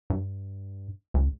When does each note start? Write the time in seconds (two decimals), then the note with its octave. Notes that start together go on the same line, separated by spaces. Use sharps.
0.10 G2
1.14 C#2